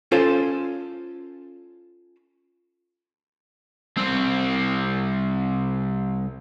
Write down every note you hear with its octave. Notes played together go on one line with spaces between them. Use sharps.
C#4 F4 A4 C5
C2 C4